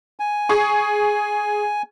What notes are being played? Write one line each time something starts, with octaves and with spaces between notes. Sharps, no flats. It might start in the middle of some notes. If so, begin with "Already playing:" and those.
G#5
G#4 C#6